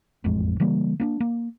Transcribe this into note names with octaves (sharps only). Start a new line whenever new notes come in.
E1 A1 F2 G#3
C#3 E3 G3 A#3
A#3 C#4 D4
A#3